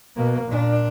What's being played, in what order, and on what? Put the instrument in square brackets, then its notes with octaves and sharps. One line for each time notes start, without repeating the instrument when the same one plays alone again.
[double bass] B2 A#3
A#2 D4